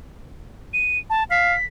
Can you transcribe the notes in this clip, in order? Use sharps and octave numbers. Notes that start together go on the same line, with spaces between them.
D#7
A5
F5 B6